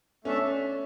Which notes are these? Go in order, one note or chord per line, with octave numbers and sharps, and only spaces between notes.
A3 C#4 D4 A4 E5 A5